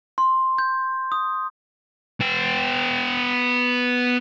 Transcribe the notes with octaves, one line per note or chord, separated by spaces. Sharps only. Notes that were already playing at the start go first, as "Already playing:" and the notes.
C6
G6
D#6
B3 G5